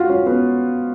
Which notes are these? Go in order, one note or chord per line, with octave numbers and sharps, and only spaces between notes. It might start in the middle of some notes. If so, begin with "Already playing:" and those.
Already playing: F4 F#4
C#4
B3